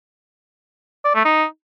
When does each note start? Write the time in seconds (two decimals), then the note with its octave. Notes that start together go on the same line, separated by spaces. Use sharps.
1.05 D5
1.15 A3
1.25 D#4